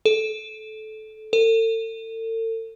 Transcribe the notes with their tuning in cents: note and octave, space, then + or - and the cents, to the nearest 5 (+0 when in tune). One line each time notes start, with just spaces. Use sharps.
A4 -20
A4 +40